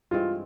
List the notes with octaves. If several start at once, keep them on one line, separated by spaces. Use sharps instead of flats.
G2 E3 G#3 C4 F4